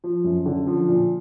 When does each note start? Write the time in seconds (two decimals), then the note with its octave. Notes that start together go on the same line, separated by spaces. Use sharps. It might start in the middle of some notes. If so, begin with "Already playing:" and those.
0.04 F3
0.24 F#2
0.46 D3
0.67 F3
0.88 A#2